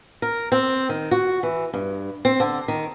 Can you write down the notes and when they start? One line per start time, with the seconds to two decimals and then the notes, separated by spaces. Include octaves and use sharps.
0.22 A#4
0.52 C4
0.89 D#3
1.11 F#4
1.43 E3
1.74 G2
2.25 C4
2.40 D3
2.68 D#3